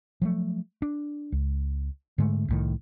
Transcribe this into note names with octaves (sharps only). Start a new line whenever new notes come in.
F3 F#3 A3
D4
C#2
G#2 D3 G#3 A3
C2 A2 D#3